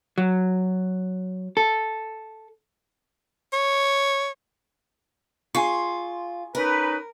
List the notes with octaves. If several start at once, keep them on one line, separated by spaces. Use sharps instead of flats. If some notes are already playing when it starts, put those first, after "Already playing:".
F#3
A4
C#5
F4 G#4 C6 C#6
C#4 D#4 A#4 B4